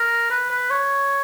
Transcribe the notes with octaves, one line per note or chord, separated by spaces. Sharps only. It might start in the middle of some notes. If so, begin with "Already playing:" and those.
Already playing: A#4
B4
B4
C#5